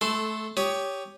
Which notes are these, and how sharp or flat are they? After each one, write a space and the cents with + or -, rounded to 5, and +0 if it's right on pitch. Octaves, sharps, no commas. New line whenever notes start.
A3 -20 A4 +0 C6 -15
G4 +0 C#5 +15 D#6 +0